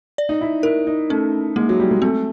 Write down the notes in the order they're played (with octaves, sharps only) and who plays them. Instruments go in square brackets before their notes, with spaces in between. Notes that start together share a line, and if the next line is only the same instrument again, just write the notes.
[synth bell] D5
[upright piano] D#4
E4
[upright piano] E4 [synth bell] A#4
[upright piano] D#4
[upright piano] A3 [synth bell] C#4
[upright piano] G#3 [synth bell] A#3
[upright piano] F#3
G3
G#3
[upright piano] A3 [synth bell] C4